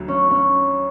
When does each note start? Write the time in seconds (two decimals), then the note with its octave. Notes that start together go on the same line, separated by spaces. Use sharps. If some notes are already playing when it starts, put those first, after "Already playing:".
Already playing: D2 D3 F#3
0.08 C#4
0.31 C#4